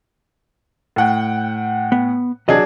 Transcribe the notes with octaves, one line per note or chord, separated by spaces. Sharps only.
A2 F#5 G5
B3
E2 C3 F#3 D4 G#4 D#5